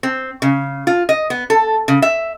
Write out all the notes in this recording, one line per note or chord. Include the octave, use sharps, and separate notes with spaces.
C4
C#3
F4
D#5
B3
A4
C#3
E5